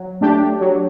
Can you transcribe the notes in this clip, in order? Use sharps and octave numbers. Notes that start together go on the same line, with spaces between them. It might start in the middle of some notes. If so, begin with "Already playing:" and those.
Already playing: F#3
A3 D4 G4
F#3